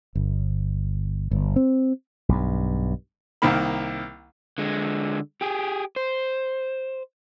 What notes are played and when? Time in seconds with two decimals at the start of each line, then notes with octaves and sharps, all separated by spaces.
0.15 G1
1.31 G1
1.56 C4
2.29 B1 G2
3.42 C2 D#3 A#3 B5
4.58 D3 G#3
5.41 G4 G#4
5.96 C5